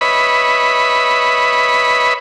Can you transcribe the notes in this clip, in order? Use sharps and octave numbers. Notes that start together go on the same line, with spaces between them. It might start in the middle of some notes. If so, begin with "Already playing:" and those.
B4 C#5 D#5 E5 B5